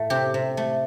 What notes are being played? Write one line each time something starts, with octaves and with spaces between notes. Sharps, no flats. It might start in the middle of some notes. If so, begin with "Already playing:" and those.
Already playing: A2 A3
C3 G4
C3
A3